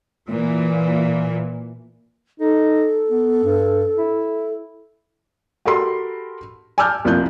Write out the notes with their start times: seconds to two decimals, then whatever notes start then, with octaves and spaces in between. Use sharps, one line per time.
0.29 A#2 E3
2.40 D#4 A4
3.08 B3
3.44 G2
3.98 E4
5.65 F#4 G4 A4 A#4 B5 C6
6.78 G#5 A5 D6 E6 F6 G6
7.05 C2 F2 A#3 F4 F#6 G6